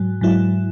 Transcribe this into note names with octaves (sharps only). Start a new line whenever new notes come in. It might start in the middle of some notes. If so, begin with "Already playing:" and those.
Already playing: G#2 F#3
G#2 F#3 E4